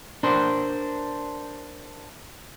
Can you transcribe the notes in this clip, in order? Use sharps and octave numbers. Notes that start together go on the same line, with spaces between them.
D4 A#4 C5